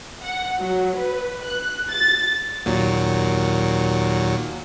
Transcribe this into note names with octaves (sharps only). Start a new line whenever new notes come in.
F#5
F#3
B4
F#6
A6
D#2 A#2 F#3